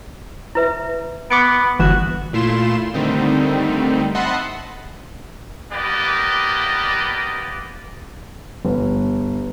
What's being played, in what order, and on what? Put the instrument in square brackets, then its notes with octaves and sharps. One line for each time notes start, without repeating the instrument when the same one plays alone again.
[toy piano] E4 B4 E5
[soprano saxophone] B3 [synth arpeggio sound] D6 C#7 D7
[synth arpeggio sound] G1 E3 E7 [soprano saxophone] F#4
[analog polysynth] A#2 A3 E4 F4 C6 E7
D3 D#3 G3 A3 C4 D#4
D#5 E5 F#5 A5 B5 C6
[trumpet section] A#3 B3 G4 B4 D5 D#5
[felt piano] G1